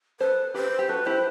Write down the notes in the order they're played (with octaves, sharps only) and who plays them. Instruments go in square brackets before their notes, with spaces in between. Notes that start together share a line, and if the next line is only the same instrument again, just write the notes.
[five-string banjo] A4 C5 [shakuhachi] B4
[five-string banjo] G4 B4 [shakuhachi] C5
[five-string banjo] G4
[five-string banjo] F#4 A4 [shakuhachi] B4
[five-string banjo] E4 G4 [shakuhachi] C5